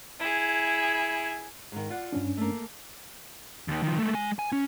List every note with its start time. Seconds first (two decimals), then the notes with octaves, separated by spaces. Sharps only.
0.20 E4 G#4
1.72 G#2 D#3
1.90 F4 D5 F#5
2.13 G2 C#4 D4
2.37 A3 A#3
3.68 D#2 D#3
3.83 D#3 F3
3.98 G#3 A3
4.14 G#3 G#5
4.39 G#5
4.52 C#4